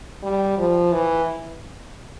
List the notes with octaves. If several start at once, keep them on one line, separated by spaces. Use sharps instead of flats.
G3
F3
E3